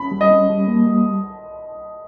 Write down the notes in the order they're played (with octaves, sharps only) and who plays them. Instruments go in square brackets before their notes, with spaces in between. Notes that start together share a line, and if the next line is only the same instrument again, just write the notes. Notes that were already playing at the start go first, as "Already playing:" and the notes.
Already playing: [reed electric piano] C#4 [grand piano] B5
[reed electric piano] G3
[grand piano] D#5
[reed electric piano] C#4
G3
A#3
G3